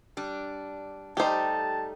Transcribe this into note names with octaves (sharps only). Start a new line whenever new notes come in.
G3 D4
G3 A3 D#4 G4 C5 A5